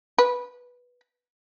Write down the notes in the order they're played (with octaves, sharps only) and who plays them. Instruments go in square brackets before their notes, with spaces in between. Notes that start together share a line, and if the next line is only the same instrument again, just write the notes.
[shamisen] B4